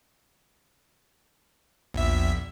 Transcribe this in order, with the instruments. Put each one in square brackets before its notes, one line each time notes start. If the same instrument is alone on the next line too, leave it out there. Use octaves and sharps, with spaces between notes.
[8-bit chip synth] A#1 E5 [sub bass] E2